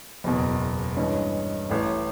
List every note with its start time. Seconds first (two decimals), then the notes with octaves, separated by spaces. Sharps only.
0.24 F#1 E2 B2
0.97 G2 E3 G#3 C#4
1.69 A1 A2 E3